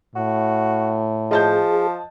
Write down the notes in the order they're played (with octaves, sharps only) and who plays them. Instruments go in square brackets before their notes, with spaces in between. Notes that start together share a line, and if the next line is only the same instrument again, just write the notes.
[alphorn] A2 [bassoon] F#4
[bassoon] F3 [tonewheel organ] G#4 [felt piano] D#5 A5 G6